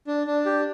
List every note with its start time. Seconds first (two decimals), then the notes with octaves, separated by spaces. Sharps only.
0.07 D4
0.27 D4
0.46 G4